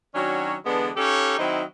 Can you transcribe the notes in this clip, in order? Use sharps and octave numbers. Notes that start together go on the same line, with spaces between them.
D#3 F#3 C#4 D4 F#4 C#5
D3 E3 G#3 B3 D4
C#4 D#4 G4 A4 C#5 F5
D#3 F#3 C4 D#4 E4